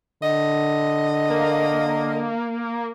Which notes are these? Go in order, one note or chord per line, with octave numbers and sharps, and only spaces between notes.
D3 D#5
A#3